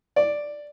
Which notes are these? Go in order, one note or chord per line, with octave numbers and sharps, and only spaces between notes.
D5